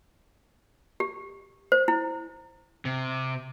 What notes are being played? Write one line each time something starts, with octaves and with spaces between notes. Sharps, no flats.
G4
C5
E4
C3